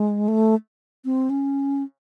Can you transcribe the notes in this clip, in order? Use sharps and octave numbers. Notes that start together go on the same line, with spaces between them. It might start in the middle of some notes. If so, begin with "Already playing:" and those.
Already playing: G#3
A3
C4
C#4